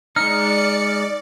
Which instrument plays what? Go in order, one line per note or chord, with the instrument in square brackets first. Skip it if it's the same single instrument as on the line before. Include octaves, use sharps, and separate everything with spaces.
[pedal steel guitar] G#3 D#4 [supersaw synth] D5 [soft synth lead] F6 [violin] C#7